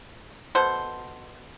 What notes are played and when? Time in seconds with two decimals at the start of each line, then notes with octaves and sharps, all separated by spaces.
0.55 B2 A4 C5